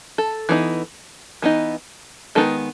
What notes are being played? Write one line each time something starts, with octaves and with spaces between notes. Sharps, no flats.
A4
E3 B3 D#4
E3 B3 D#4
D#3 G#3 B3 D#4 A4